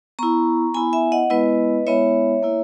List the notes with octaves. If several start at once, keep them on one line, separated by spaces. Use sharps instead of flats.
B3 E4 A#5 C#6
B3 E4 G#5 B5
E5 G#5
D#5 F#5
G#3 B3 E4 B4 D#5
G#3 B3 E4 C#5 E5
A#3 E4